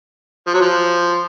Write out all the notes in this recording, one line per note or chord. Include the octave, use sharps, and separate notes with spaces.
F3
F#3
F3